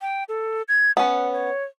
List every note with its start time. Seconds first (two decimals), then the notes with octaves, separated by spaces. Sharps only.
0.02 G5
0.29 A4
0.68 G#6
0.97 B3 C#4 F#5
1.33 C#5